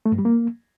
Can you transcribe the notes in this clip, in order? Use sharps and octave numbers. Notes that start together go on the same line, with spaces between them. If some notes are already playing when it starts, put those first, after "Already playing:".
A3
G2
G3
A#3